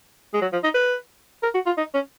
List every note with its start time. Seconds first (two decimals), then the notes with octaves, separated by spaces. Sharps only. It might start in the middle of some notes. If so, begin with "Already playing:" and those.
0.34 G#3
0.42 F#3
0.53 F3
0.64 D#4
0.75 B4
1.43 A#4
1.55 F#4
1.66 F4
1.78 D#4
1.94 C#4